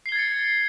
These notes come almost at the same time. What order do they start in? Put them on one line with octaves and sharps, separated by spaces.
C7 G7 G#6 A6 C#7